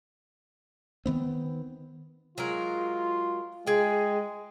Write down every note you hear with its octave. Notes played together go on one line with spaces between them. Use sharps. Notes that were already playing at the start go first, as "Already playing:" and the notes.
D#3 B3 C4
F#3 G#3 F4 A#4
G#3 G#4 G5